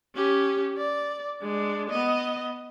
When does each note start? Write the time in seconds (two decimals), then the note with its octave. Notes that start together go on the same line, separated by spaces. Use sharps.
0.16 C#4 G4
0.77 D5
1.42 G#3 D4
1.90 B3 D#5